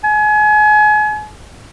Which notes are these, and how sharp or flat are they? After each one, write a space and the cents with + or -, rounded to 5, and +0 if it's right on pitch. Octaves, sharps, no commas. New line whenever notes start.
G#5 +35